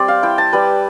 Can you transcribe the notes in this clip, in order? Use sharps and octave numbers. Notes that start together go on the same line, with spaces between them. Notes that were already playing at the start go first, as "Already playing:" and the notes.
Already playing: G3 C4 C5 D5
F5
E4 G5
A5
G3 B4